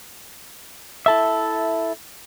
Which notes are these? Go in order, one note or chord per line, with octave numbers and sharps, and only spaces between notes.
E4 A4 E5